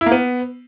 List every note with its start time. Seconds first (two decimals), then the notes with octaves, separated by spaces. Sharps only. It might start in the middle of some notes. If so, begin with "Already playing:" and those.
0.01 E4
0.06 A#3
0.12 B3